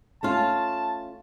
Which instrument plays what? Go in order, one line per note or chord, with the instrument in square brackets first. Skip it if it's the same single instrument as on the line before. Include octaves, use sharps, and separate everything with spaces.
[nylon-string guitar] A3 C#4 F4 [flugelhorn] A5